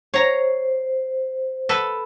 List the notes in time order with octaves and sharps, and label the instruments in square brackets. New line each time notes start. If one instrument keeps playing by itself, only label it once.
[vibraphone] C5 [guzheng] C#5 A#5
[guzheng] A4 B4